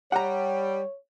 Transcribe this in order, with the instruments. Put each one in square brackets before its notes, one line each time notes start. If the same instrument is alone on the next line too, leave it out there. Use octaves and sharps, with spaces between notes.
[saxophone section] G3 [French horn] C#5 [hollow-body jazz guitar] F#5 A#5